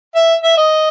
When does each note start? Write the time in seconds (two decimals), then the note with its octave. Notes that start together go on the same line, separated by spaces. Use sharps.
0.15 E5
0.43 E5
0.57 D#5